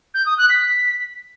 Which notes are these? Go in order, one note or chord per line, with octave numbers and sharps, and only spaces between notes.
G6
D#6
F#6
B6